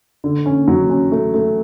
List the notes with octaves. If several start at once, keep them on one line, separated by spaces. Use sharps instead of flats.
D3
C#4
F#3
C#4
A3
A3